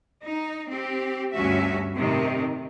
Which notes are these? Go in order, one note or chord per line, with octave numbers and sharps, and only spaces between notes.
D#4
C4 G4
D2 G2 C#4 F#4 E5
A2 C3 D#3